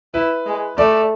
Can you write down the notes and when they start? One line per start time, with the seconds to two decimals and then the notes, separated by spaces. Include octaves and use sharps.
0.14 E4 B4
0.46 G#3
0.78 A3 D5